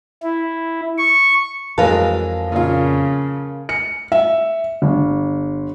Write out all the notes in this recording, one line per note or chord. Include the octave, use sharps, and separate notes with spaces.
E4
C#6
F2 E3 F#3 G#3 A#4 B4 F5 A5
A#2 C#3 F4
C#7
E5
G1